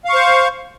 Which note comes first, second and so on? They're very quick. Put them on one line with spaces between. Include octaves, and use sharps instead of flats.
F5 C#6 C5